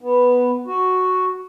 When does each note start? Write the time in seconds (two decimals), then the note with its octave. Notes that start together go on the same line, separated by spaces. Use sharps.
0.01 B3
0.67 F#4